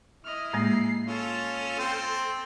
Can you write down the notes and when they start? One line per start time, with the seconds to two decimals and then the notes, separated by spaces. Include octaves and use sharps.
0.25 E4 D#5 F6
0.53 A2 G#3 A#3 C7
1.07 C#4 F4 A4 A5
1.79 C4 C5